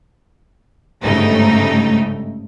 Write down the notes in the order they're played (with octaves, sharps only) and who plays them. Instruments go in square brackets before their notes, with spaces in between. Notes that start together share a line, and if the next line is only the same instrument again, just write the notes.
[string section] G1 G#2 C#3 A3 D#4 G5